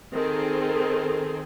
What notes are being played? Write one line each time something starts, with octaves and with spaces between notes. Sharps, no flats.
D#3 C4 G#4 A4